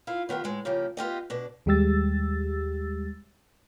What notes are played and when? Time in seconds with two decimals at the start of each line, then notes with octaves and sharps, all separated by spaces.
0.07 E4 F4 F5
0.29 D#3 B3 F4 G4
0.44 A2 G#3
0.65 C#3 F3 A#3 G4
0.97 B3 F4 G4 D#5
1.30 B2 D4
1.66 D#2 G3 G#3 G4 E6 A6